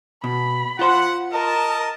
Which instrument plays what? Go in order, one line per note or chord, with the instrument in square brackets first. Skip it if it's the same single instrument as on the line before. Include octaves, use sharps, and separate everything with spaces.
[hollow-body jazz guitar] B2 [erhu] B5
[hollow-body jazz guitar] F4 C5 [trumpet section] F#5
[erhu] A#4 [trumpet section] D#5 A5